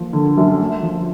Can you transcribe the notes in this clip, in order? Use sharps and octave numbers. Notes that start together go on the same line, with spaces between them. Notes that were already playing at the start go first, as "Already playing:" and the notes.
Already playing: F3 A#3
D3
F#2
A3
F3